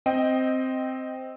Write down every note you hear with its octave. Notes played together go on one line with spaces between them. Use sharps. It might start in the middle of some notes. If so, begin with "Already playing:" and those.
C4 D#5 G5